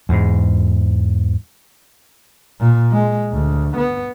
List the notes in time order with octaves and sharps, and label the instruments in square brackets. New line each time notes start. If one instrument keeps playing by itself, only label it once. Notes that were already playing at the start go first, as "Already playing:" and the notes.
[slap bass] E2 G#2
[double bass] A#2
G#3
D2
B3